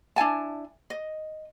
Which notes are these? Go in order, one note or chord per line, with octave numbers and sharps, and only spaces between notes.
D4 E4 G#5 A5
D#5